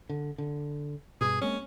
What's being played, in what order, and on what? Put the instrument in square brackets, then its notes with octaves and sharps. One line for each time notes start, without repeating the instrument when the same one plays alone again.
[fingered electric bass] D3
D3
[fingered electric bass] G2 B2 [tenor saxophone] G#4
[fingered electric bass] G#3 A#3 C4 [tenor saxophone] C#4